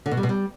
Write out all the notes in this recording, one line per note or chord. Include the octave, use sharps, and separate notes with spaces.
D3
B2
G3
B2
G3